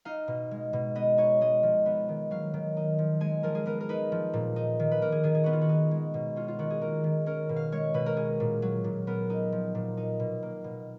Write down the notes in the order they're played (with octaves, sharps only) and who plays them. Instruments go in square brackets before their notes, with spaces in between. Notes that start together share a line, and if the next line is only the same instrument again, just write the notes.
[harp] D#4 F5
B2
G#3
B2
B3 D#5
D#4 C#5
G#3 D#5
F3
B3
D#3
F#3 F5
D#3
D#4
F3
G#3 G#5
F3 A#4
G#4
B3 A#4
A#4
D#4 B4
F3
A#2
D#4
D#3
B4
A#3 A#4
G#4
D#3 G#4
G#4
B3 F#4
F4
F#4
D#4
G#3
B2
C#4 F4
F4
D#3 F#4
G#4
A#3 A#4
D#3
C#4 A#4
B2
F5
G#3 C#5
B2 B4
A#4
C#4 G#4
A#2
F#3
A#2
B3 A#4
D#4
F3
A#2
D#4
B2
A#3
B2